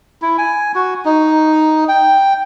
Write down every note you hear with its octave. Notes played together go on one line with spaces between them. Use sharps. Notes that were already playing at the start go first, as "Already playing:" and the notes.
E4
G#5
F#4
D#4
G5